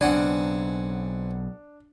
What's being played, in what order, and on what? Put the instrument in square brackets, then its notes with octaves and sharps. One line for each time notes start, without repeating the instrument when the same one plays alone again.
[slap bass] B1 C#3 [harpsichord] C4 F#5 G#5 [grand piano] D4